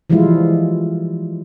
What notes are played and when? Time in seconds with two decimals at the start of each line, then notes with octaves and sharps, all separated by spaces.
0.10 E3 F3 G3 G#3 E4 F4